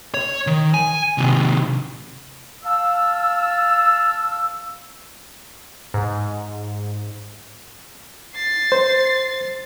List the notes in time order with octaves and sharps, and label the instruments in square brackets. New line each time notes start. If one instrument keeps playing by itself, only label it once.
[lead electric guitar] C#5
D#3
G#5
C3 D#3
[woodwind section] F5 A5 E6
[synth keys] G#2
[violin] A6 C7
[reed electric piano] C5